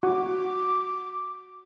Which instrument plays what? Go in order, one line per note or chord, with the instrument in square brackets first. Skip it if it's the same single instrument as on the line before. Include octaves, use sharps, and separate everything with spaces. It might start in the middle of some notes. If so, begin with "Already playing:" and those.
[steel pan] F#4 [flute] D6